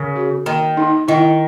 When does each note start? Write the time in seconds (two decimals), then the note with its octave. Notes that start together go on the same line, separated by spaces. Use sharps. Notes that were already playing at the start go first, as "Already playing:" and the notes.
Already playing: C#3 A#4
0.16 F#4
0.46 D#3 A#3
0.77 D#4
1.08 D#3 E4